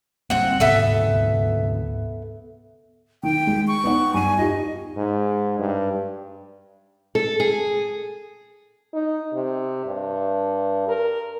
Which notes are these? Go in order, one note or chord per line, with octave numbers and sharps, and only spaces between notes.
A2 G3 A#3 C4 F#5
D2 G#2 C3 B3 A4 E5
D#3 G5
G#3
C#6
B3 D#4 F#5
G2 G#5 D#7
D#4 F4 G4 D#5
G#2
G2
A4
G#4
D#4
C3
G2
A#4